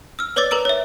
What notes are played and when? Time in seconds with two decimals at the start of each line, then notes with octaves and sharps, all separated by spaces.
0.19 E6 F6
0.36 B4 C#5 D5 D6 E6 A6
0.51 A#4 B4 A#5 E6 D7
0.65 C#5 E5